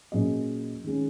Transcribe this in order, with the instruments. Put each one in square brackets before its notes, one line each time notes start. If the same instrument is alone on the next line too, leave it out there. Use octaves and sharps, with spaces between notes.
[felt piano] A#2 F#3 C#4 G#4 D#5
D#3 G#3 C#4